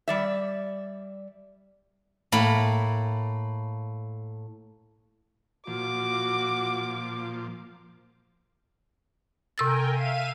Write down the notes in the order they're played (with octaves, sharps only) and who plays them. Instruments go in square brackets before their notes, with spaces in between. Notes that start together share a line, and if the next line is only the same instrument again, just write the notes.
[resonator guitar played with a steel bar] G3 D5 E5
[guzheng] A2 A#3 B5
[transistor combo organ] A#2 F3 [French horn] F#4 [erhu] D6
[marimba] C3 E6 A6 [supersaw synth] A#4 G5 G#5
[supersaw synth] E5 F5 D#7